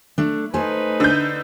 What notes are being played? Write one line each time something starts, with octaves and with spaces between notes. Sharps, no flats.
A3 D4
A3 D#4 B4 C5 G#5
D3 G6